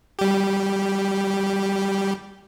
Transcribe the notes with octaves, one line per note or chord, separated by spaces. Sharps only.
G3 G4